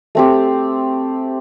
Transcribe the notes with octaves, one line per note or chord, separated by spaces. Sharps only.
A3 C4 G4